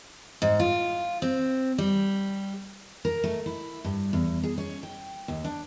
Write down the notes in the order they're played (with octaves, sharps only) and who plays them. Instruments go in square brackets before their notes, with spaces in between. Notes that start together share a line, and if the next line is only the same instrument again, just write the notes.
[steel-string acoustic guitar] G#2
F4
C4
G3
A#4
A3
E4
G2
E2
G#4
C#4
G5
D#2
D4